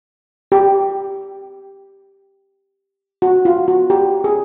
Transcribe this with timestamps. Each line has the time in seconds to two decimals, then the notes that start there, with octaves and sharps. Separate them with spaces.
0.52 G4
3.22 F#4
3.45 F4
3.68 F#4
3.90 G4
4.24 G#4